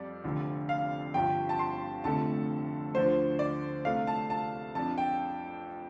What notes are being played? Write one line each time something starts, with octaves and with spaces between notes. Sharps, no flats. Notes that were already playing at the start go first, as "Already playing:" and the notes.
Already playing: F2 G3 D5
F1 F2 D3
F5
G1 G2 F3 G5
A5
C6
F1 F2 D3 F3 A3 A5
D2 D3 F3 D4 C5
D5
C2 C3 A3 D4 F5
A5
A5
F2 F3 D4 A5
G5